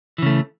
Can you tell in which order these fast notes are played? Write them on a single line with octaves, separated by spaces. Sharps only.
E3 C#3 A3